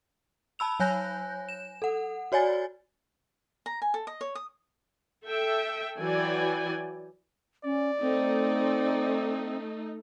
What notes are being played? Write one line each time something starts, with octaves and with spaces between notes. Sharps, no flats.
A5 B5 E6 F7
F#3 C#5 G#5 F#6 G6 A#6
E7
A4 F#5
F#4 C#5 D5 G#5 A6
A#5
G#5
A4
D#5
C#5
D#6
A4 E5 G5
E3 F#3 F#4 D5 G5 G#5
C#4 D5
A3 C4 D#4